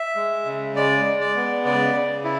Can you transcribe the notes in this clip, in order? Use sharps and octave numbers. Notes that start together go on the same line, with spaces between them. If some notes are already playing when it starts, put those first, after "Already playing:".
Already playing: E5
G#3
C#3
G#3 D5
G#3
D5
B3
C#3 D5
C#3
E4